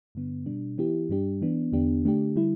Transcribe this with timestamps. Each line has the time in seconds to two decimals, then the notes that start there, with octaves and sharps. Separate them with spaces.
0.15 G2 D3 B3
0.46 B2 G3 D4
0.78 E3 B3 E4 G4
1.09 G2 G3 D4 G4
1.41 E3 B3 D4
1.72 E2 D3 B3 D4 G4
2.05 D3 A3 D4 G4
2.36 D3 G3 E4